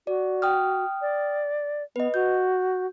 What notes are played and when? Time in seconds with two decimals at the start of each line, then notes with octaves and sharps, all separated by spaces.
0.07 F#4 D5
0.42 G5 D#6 F6
1.01 D5
1.96 B3 B4 D#5
2.14 F#4 G6